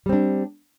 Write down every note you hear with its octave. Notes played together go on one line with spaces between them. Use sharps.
G3 C4 D4